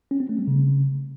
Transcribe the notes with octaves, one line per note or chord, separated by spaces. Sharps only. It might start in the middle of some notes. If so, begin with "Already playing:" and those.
C#4
C4
A3
G3
C#3